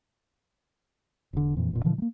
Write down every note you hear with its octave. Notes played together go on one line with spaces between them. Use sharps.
E1 D3
F2 A#2 E3
D#1 E2 A#2
A#2 D3 E3 F3
F#3 A#3